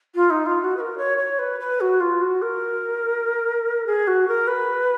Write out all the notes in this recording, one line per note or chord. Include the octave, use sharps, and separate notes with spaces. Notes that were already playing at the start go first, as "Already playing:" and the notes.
F4
D#4
F4
F#4
B4
A#4
C#5
C#5
B4
B4
F#4
F4
F#4
A#4
G#4
F#4
A#4
B4